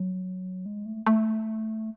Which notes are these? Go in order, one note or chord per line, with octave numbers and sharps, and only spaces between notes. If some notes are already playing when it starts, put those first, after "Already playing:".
Already playing: F#3
G#3
A3
A3